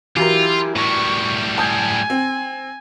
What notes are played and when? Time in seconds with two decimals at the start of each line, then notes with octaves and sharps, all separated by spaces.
0.17 E3 F#3 E4 F4 G4 A#4
0.76 A2 G3 C#6
1.58 G#5 A5 D#6 G6
2.10 C4